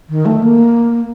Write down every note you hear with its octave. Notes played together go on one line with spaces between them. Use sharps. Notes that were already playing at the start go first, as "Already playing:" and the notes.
D#3
A3
A#3